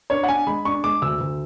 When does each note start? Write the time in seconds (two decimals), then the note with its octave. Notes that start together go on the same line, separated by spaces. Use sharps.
0.10 D4 C#5
0.24 F#5
0.28 D4 G#5
0.47 G#3 B5
0.65 D4 C#6
0.84 G#3 D6
1.02 D2 E6
1.20 D2